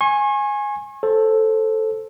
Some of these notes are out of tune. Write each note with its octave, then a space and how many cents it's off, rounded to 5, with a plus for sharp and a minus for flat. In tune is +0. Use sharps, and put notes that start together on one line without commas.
G#5 +0 C#6 -40
A4 +0 C5 +15